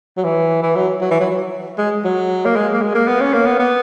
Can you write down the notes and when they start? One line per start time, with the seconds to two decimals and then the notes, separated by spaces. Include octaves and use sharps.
0.17 F#3
0.24 E3
0.63 E3
0.75 F#3
1.01 F#3
1.11 E3
1.20 F#3
1.31 F#3
1.78 G#3
2.05 F#3
2.45 A#3
2.56 G#3
2.74 A#3
2.82 G#3
2.95 A#3
3.07 B3
3.21 C#4
3.34 A#3
3.46 B3
3.59 B3